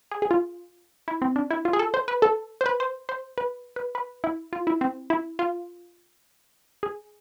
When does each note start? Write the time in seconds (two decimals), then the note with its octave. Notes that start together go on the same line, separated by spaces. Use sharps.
0.11 G#4
0.22 G#4
0.31 F4
1.08 E4
1.22 C4
1.36 D4
1.50 E4
1.65 F4
1.73 G#4
1.79 A4
1.94 C5
2.08 B4
2.22 A4
2.61 C5
2.66 B4
2.80 C5
3.09 C5
3.38 B4
3.76 B4
3.95 B4
4.24 E4
4.53 F4
4.67 E4
4.81 C4
5.10 E4
5.39 F4
6.83 G#4